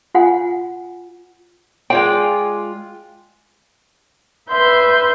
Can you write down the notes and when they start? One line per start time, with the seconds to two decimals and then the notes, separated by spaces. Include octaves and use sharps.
0.15 F4 F#5 G#5
1.90 G#3 F4 D5 G5
4.50 B4 E5 C6 G6